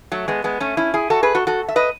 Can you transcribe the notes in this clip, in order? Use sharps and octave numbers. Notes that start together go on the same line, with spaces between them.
F#3 A3
G#3 B3
G#3 B3
A3 C#4
C#4 E4
E4 G#4
F#4 A4
G#4 B4
F#4 A4
F#4 A4
E5
B4 D#5